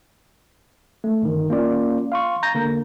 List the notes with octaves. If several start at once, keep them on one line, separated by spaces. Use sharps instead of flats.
A3
G1 D#3
A#3 C#4 F4 D5
F5 C6 C#6
A#5 G6 A6 A#6
D3 A#3